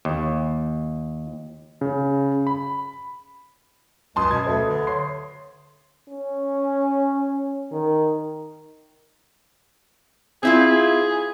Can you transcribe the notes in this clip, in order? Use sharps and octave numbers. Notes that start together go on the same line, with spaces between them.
D#2
C#3
B5
C#2 F#2 A5 C6 D#6
B2 G#6
D2 A4 B4 E5
D3
C#5 C6 C7
C#4
D#3
C4 E4 F4 G#4